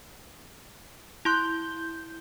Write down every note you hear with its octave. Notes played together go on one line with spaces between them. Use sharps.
E4 C6 F#6 G6